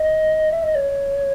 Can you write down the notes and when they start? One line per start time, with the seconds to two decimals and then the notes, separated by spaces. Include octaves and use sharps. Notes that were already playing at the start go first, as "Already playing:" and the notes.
Already playing: D#5
0.51 E5
0.63 D#5
0.75 C#5